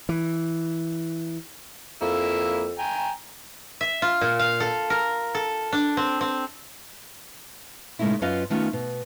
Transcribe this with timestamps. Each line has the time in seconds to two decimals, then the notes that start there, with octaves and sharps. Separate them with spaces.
0.09 E3
2.02 F2 A#3 E4 E6
2.79 G5 G#5 A#5
3.81 E5
4.02 F4
4.21 A#2
4.39 F5
4.60 A4
4.90 A#4
5.35 A4
5.73 D4
5.97 C4
6.21 C4
7.99 A#2 C#3 G#3 A3 D#4 E4
8.22 F#2 C#4 F4 B4 D#5 F5
8.50 D#3 A3 B3 C#4 F4
8.73 B2